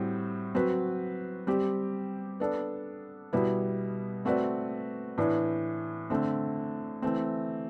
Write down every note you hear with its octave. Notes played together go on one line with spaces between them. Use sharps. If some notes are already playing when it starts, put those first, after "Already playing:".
Already playing: A2 G3 C4 F#4
F#3 C4 F#4 B4
G3 C4 G4
B3 D4 A4
B2 G3 B3 E4
A3 C4 F#4 B4 D5
A2 E3 B3 D4
D3 A3 C4
E3 A3 C4